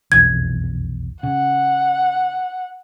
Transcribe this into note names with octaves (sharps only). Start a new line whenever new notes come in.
F1 B1 E2 G#6
C#3 F#5